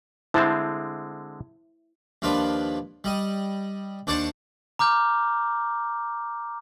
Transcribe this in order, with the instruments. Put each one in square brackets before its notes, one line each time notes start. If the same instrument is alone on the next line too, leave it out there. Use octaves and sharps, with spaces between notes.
[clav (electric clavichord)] D3 G#3 C4 [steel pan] E4 C5 A5
[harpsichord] D#2 F3 D4 F4 B4
G3 D#5 D#6
D#2 D4 C5 D5 A5 C#6
[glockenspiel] A#5 D6 F6 G6